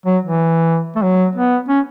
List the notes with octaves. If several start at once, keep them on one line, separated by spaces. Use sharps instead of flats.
F#3
E3
A3
F#3
B3
C#4